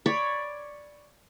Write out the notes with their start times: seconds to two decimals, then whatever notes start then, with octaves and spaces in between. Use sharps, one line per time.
0.06 C#5 D5 B5 D6